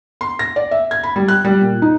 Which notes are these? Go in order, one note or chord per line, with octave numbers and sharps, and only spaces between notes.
C6
A#6
D5
E5
G#6
B5
G3
F#6
G3
A#2
D#4